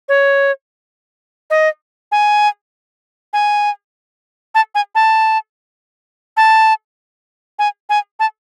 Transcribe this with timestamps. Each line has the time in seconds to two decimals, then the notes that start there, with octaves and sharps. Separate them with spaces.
0.09 C#5
1.50 D#5
2.12 G#5
3.33 G#5
4.55 A5
4.75 G#5
4.95 A5
6.37 A5
7.59 G#5
7.90 G#5
8.20 A5